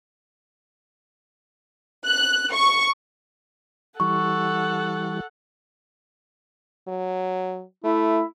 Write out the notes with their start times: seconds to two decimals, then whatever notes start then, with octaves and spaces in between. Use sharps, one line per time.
2.06 F#6
2.53 C#6
4.00 E3 G3 A4 F#5 C#6
6.88 F#3
7.84 A3 E4